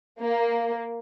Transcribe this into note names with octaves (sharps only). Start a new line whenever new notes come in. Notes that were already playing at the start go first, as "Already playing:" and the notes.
A#3